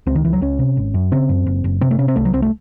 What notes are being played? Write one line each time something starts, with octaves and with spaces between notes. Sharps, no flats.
C#2 C4
D#3
C#2 E3
F#3
C#2 C#4
C3
G#1
F#2
C#3 C4
F#2
F#1
F#1
C3 C4
A3
C3 C#4
C4
C2 A3
F#3
C2 C4
A3